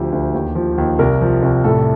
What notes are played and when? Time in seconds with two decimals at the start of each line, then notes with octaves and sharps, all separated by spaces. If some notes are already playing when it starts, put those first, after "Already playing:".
Already playing: D2 F3 G4
0.13 D2
0.34 D#2
0.55 F3
0.78 D#2
0.99 C2 A#4
1.21 F3
1.43 C2
1.64 A2 A4